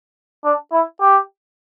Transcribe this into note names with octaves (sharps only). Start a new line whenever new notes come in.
D4
E4
G4